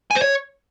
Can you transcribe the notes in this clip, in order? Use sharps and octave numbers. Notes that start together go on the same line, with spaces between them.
G#5
C5
C#5